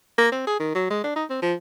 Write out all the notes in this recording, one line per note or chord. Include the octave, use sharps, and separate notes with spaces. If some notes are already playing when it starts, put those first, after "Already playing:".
A#3
C4
G#4
D#3
F#3
G#3
D4
D#4
C4
F3